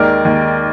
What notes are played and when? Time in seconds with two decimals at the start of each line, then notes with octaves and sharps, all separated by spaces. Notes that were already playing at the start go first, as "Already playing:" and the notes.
Already playing: D#2 D#3 G#3 A#4 D5
0.25 D#2 D#3 G#3